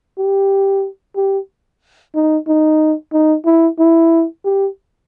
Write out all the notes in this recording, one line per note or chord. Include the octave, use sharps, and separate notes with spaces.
G4
G4
D#4
D#4
D#4
E4
E4
G4